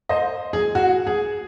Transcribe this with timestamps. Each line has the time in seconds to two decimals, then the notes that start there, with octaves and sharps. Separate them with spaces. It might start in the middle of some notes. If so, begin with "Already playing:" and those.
0.09 C5 D#5
0.53 G#4
0.75 F#4
1.07 G#4